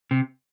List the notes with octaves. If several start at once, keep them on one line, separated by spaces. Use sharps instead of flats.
C3